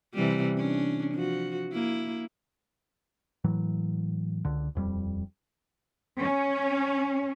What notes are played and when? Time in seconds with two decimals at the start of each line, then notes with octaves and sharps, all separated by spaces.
0.14 C3 E3 G3
0.57 C#4 D4
1.14 F3 F#4
1.72 A#3 E4
3.44 A2 E3 F#3
4.45 C#2 D3
4.75 D#1 F2 G3
6.21 C#4